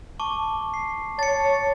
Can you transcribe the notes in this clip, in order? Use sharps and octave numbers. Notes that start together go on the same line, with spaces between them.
A5 C#6 D6
C7
C#5 A5 A6 C#7